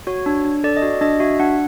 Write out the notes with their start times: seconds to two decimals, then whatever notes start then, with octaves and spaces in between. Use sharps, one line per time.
0.07 F#4 C#5
0.26 D4
0.45 D4
0.64 A4 D5
0.77 D#5
0.82 F#4 D5
1.01 D4 D#5
1.20 F#4 E5
1.40 D4 F#5